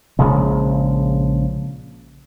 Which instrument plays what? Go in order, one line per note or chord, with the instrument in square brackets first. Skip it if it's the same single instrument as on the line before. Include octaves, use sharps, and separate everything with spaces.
[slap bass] A#1 C#3 F3 G#3